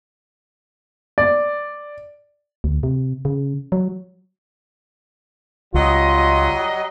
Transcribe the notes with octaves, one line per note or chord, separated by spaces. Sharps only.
D5
D2
C3
C#3
F#3
C#2 F#3 G3 F4 D#5